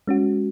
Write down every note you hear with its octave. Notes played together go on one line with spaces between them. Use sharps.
G#3 C#4 F#4